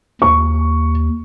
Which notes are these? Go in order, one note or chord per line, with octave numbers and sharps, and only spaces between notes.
D#2 C#6